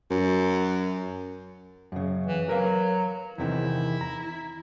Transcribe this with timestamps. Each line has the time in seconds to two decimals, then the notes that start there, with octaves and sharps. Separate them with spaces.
0.11 F#2
1.92 F#2 C#3
2.27 E3
2.49 F#3 A#4 B4 F5
3.38 E2 C3 D#3 E4
4.01 A#5